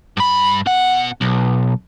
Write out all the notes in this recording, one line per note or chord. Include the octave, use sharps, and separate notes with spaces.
G2 B5
B2 F#5
B1